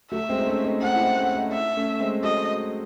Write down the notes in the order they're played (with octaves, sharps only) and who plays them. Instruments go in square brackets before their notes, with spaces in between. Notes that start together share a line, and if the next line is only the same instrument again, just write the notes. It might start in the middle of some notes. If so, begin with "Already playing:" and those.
[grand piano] F#3 A3 [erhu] E5
[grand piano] G#3 C4
D#4
A3 C#4
C4 D#4
[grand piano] C4 D#4 [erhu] F#5
[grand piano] E4
C4 D#4
A3 C#4
C4 D#4
[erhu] E5
[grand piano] A3 C#4
G#3 C4
[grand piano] F#3 A3 [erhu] D#5